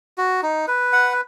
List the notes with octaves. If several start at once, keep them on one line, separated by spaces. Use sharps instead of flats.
F#4
D#4
B4
F#5